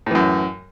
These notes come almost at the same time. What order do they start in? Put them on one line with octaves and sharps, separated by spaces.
A2 E3 F#2